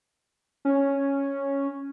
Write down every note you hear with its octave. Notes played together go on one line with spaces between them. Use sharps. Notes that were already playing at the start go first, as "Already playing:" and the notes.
C#4